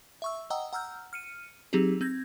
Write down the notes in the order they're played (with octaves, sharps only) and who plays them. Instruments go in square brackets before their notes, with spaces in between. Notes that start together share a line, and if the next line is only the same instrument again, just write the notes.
[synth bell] E5 C#6 E6
D#5 F#5 G5 A#5 D#6 E6
F#5 A#5 E6 F6 G6
F6 C#7 D#7
F#3 C4 D#4 G4 G#4
C4 G6 G#6 A#6